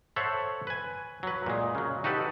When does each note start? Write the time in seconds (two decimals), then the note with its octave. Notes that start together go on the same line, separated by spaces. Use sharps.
0.16 A4 C5 C#5 E5 F#5
0.67 B4 G#5
1.23 F#3 B4
1.46 A#2 G#3
1.75 C#3 F#3
2.04 D#4 F#4 G4 A4 B4